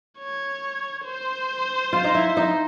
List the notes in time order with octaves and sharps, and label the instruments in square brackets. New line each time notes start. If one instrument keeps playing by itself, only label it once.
[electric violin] C#5
C5
[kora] F4
D#4
E4
D#4